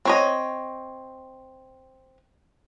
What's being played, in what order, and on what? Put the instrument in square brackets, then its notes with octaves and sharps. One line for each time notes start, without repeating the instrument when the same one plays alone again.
[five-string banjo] C4 C#5 D#5